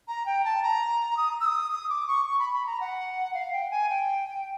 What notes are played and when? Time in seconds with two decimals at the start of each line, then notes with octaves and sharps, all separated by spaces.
0.08 A#5
0.26 G5
0.45 A5
0.63 A#5
1.17 D#6
1.41 E6
1.46 D#6
1.72 D#6
1.90 D6
2.08 C#6
2.26 C#6
2.39 B5
2.53 B5
2.67 A#5
2.81 F#5
3.34 F5
3.53 G5
3.71 G#5
3.89 G5